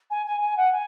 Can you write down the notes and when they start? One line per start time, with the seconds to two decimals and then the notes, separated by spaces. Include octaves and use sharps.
0.10 G#5
0.26 G#5
0.41 G#5
0.57 F#5
0.72 G#5